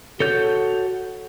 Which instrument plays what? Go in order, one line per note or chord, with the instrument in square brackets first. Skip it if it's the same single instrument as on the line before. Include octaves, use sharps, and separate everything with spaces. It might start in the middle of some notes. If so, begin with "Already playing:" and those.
[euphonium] F#4 [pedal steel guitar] A4 C#5 G6